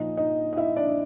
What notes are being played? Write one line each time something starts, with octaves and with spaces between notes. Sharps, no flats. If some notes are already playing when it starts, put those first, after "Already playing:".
Already playing: A#2 F3 D#4 D#5
D#4 D#5
D#5
E4 E5
D4 D5